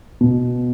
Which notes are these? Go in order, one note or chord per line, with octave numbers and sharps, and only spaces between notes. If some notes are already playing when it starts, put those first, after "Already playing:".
B2